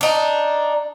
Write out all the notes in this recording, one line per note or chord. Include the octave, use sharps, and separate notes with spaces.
D4 D#4